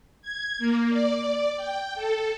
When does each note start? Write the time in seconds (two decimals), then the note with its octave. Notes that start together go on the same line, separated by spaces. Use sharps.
0.22 G#6
0.59 A#3
0.89 D5
1.21 D5
1.56 G5
1.95 A4